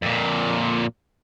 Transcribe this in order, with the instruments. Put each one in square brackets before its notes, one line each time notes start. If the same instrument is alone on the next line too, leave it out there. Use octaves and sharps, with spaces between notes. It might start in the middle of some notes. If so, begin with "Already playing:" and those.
[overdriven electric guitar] F2 A#2